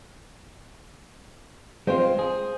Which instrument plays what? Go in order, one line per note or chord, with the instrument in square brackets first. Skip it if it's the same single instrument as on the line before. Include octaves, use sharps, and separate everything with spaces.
[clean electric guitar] G#3 C4 F4 [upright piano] C5
[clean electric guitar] G#4